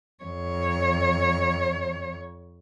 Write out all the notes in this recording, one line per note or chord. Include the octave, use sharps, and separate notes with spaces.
F2 C#5